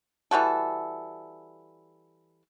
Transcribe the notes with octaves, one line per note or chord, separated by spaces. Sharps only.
E3 G3 F#4 A4